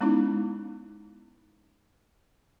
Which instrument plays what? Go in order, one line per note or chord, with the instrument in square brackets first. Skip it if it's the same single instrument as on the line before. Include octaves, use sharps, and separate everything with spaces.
[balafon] G#3 B3 C#4 D#4 E4